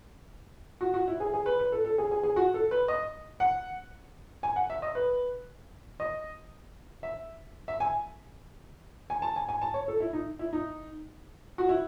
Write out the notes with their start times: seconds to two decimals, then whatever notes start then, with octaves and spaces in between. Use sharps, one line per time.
0.81 F#4
0.94 F#4
1.08 E4
1.20 G#4
1.34 G#4
1.46 B4
1.59 B4
1.72 A4
1.85 A4
1.98 G#4
2.11 G#4
2.23 G#4
2.36 F#4
2.54 A4
2.71 B4
2.88 D#5
3.40 F#5
4.43 G#5
4.56 F#5
4.70 E5
4.82 D#5
4.95 B4
6.00 D#5
7.03 E5
7.68 E5
7.80 G#5
9.10 G#5
9.22 A5
9.36 G#5
9.49 G#5
9.62 A5
9.74 C#5
9.88 A4
10.00 E4
10.13 D#4
10.39 E4
10.53 D#4
11.58 F#4
11.69 E4